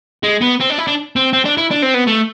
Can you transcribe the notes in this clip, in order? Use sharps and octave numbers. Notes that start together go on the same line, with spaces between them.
G#3
B3
C4
D4
E4
D4
C4
C4
D4
E4
D4
C4
B3
A3